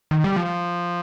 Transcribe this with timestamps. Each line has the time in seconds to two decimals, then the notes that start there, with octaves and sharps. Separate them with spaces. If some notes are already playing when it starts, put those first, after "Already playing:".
0.11 D#3
0.24 G3
0.36 F3